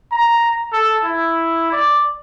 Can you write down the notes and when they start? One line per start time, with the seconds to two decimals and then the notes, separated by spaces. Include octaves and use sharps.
0.12 A#5
0.73 A4
1.04 E4
1.72 D5